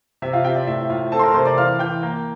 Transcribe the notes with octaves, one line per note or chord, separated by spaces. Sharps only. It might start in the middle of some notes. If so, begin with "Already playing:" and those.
C3 E5
F4 F5
C4 G4 G5
D5
A2 E5
A2 F4 F5
C4 A4 A5
C6
A#4 A#5
C3 C5 C6
D5 D6
E3 F5 F6
E3 G5 G6
A#3